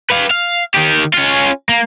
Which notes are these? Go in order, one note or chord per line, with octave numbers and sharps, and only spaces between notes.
B4 F5
F5
D#3 G4
C#4 F4
A#3